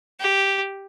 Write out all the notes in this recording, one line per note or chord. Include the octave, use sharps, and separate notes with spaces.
G4